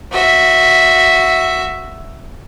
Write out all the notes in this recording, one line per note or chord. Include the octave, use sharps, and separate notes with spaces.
F#4 E5